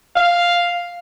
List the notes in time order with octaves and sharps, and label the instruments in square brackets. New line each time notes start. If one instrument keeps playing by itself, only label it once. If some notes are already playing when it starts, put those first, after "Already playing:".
[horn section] F5